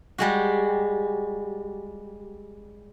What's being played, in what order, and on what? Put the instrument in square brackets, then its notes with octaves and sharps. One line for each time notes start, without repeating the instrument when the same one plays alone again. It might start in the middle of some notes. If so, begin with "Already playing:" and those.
[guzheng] G3 G#3 F#4